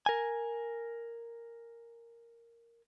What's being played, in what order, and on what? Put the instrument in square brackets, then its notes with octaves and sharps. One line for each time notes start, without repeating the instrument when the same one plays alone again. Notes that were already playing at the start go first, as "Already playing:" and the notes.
[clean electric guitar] A#4 G#5